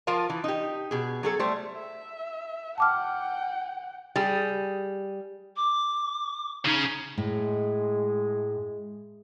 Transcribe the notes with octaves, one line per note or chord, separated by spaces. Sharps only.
F3 F4 A#4 F5 A5
E3
D#4 G4
B2 G#4
F#3 G#4 A4
G3 A3 C5
E5
F#5 G5 A5 D6 F6
G3 G#4
D6
C#3 C#4 D#4
A2 G#3